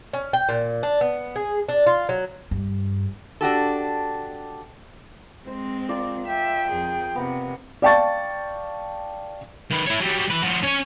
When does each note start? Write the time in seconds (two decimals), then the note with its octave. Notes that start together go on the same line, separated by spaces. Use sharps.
0.13 C#4
0.33 G5
0.49 A#2
0.83 D4
1.01 B3
1.36 G#4
1.69 D4
1.87 F4
2.09 F#3
2.51 G2
3.41 D4 F#4 G4 A4
5.47 G#3 C4 C5
5.89 F4 A#4 D5
6.27 E5 G5
6.68 F2 G#4
7.16 C3 B3 A#4 F#5
7.82 D5 F5 G5 A5 C#6 A6
9.71 D#3 B4
9.86 E4 C#5
10.00 F#3 G3
10.30 E3 B4
10.42 F3 F#4
10.63 C#4 C#5